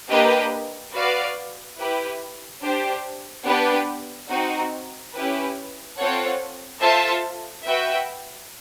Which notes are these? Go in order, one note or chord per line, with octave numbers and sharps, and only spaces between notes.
A#3 D4 G4 B4 D#5
F#4 B4 D5 F5
E4 G4 B4
D4 G4 C5
B3 D4 G4 B4
C4 D#4 F#4
C#4 E4 G4 B4
C4 F4 A4 C#5 F#5
F4 A4 C5 E5 A5
F#4 B4 E5 G5